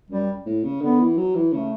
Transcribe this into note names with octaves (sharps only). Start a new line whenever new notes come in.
F#2 G3
A2
C#3
D3 B3
E3
F#3
E3
C#3 A3